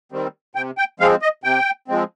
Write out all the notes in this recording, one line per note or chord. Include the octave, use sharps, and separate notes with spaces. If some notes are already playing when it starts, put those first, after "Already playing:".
D#3 G3 C4
C3 G5
G5
F3 G#3 C4 F5
D#5
C3 G5
F3 G#3 C4